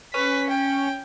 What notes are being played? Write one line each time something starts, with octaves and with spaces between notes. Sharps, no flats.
C#4 B4 B6
G5